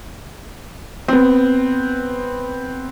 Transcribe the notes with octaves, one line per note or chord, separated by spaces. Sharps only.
B3 C4